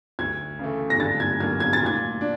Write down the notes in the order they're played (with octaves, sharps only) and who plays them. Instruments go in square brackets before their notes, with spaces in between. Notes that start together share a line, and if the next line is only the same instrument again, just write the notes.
[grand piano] D2 [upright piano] G#6
[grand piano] C#3 E3 A3
[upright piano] A#6
[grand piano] D3 [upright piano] A6
[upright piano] G#6
[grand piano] F#3 A#3 [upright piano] G#6
[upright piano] G#6
A6
[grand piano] A#2
[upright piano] G#6
[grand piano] D4